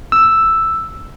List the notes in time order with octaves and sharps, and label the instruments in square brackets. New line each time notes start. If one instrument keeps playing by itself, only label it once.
[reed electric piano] E6